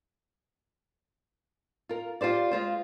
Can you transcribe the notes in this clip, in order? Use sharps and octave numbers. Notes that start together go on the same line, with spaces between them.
F4 A#4
F4 G4 C5 D5
G#3 F4 C5